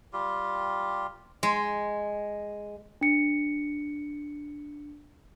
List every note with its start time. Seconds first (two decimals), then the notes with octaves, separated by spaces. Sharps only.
0.13 G3 F4 G4
1.43 G#3
3.01 D4 C#7